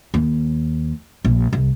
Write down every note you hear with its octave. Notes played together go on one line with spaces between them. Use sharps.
D#2
A#1
C2